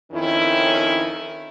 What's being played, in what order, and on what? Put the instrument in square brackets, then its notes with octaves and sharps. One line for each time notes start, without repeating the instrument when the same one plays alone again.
[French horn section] F2 D#3 C#4 E4